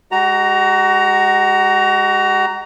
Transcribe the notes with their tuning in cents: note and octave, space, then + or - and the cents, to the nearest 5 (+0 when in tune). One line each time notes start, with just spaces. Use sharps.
G#3 -20 F#4 +30 A#5 +0